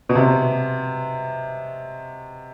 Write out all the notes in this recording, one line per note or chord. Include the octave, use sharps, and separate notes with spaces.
B2
C3